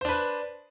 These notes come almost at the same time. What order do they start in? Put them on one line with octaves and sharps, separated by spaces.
C5 D4 B4